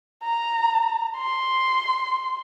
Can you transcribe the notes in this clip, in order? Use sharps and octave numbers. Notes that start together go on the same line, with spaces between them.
A#5
C6